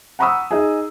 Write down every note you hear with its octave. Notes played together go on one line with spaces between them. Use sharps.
F#5 A#5 B5 C#6 D#6 E6
D#4 G#4